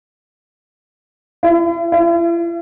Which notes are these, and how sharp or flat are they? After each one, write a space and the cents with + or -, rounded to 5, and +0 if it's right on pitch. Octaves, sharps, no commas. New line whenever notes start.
E4 +40
E4 +45